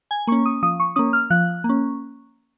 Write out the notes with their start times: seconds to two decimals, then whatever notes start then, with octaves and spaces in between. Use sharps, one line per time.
0.11 G#5
0.27 A#3 C#6
0.32 C#4
0.46 D#6
0.63 F3 D#6
0.80 C#6
0.96 A#3 C#4 D#6
1.13 F6
1.30 F3 F#6
1.64 A#3
1.69 C#4